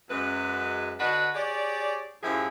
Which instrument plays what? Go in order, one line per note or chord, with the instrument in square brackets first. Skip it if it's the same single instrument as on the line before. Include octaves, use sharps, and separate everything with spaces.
[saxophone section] F#2 G#3 B4
D3 D4 F#4 B4 D#5 F#5
G4 G#4 C#5 D5
F#2 A2 F3 E4 G4 G#4